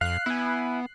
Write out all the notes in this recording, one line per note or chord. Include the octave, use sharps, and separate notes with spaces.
F2 F5 F#6 C7
B3 E4 G#5